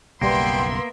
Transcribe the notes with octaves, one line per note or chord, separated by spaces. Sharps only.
F#1 B1 G3 A#3 B3 E5 G5 C6